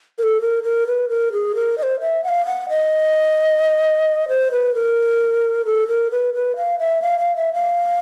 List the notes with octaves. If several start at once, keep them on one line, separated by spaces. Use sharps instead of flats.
A#4
A4
A#4
A#4
B4
A#4
G#4
A#4
D#5
C5
E5
F#5
F5
F#5
D#5
C5
B4
A#4
A4
A#4
B4
B4
F5
E5
F5
F5
E5
F5